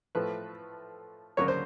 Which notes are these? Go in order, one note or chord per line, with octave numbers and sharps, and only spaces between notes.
A2 F3 A3 B4
D2 C#3 F#3 A#3 C#5
C5